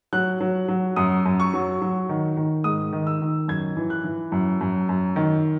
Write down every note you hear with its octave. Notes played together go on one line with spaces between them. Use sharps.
F#3 F#6
F#3
F#3
F#2 D#6
F#2
C#6
F#3
F#3
D#3
D#3
G#2 D#6
D#3
E6
D#3
F#2 G#6
E3
F#6
E3
F#2
F#2
F#2
D#3